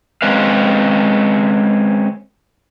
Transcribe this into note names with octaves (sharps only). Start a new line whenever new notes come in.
G#3 C4 C#4 B4 F5